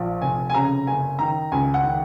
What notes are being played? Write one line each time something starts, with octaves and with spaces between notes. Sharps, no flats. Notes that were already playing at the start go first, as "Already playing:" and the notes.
Already playing: A#1 F3
F1 G#5
G#5
C#3 A#5
F#1 G#5
D#3 A#5
C#2 G#5
F#5
D#3